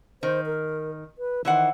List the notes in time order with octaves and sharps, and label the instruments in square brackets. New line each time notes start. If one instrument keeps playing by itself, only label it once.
[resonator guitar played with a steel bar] D#3 [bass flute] C5
[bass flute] A#4
B4
[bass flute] D#3 [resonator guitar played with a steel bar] E3 C5 F#5